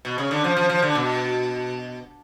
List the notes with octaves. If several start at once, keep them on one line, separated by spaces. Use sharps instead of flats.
B2
C#3
D3
F3
F3
F3
D3
B2